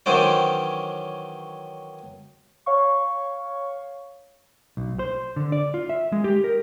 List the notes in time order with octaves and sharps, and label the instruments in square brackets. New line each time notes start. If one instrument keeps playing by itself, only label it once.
[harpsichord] D#3 E3 F#3 C#4 C5 D5
[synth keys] C#5 F5 C#6
[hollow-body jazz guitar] B1
C5
D3
D5
F4
E5
G#3
G4
A#4